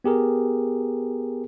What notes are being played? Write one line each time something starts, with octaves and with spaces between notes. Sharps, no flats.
B3 G4 G#4 A#4